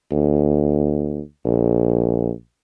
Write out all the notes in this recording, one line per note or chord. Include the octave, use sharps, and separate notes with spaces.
D2
A#1